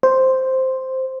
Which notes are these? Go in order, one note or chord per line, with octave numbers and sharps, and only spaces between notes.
C5